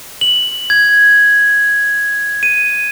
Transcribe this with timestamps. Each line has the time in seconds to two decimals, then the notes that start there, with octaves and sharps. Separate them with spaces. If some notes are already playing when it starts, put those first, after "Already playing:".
0.21 F#7
0.70 G#6
2.43 D#7